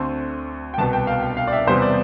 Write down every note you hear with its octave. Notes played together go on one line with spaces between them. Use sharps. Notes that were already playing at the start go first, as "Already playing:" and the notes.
Already playing: D2 D3 A3 C4 C6
G5
C2 B2 B3 A5
G5
F5
G5
F5
D5
E5
E2 C3 G3 B3 C5
D5